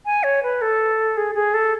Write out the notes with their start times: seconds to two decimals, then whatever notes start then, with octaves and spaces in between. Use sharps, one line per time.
0.05 G#5
0.23 C#5
0.43 B4
0.61 A4
1.17 G#4
1.35 G#4
1.54 A4